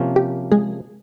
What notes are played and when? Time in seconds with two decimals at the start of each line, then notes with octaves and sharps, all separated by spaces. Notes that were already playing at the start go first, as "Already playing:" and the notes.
Already playing: C3 F3 A#3 C#4
0.16 G4
0.52 G#3 G#4